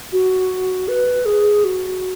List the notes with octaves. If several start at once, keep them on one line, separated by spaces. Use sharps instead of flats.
F#4
B4
G#4
F#4